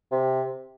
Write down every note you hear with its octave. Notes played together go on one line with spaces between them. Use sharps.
C3